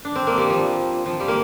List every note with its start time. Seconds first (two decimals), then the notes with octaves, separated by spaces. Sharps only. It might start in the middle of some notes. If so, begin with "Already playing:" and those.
0.05 D4
0.16 C4
0.27 A#3
0.38 G3
0.50 F3
1.06 F3
1.20 G3
1.28 A#3